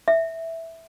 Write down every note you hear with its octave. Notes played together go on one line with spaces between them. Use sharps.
E5